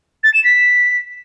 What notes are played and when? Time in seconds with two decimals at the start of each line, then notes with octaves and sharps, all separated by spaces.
0.24 A6
0.34 E7
0.44 B6